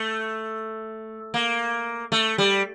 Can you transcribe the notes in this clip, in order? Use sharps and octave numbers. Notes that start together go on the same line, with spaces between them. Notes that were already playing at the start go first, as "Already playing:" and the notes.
Already playing: A3
A#3
A3
G3